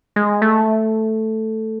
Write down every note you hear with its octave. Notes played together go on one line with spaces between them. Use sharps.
G#3
A3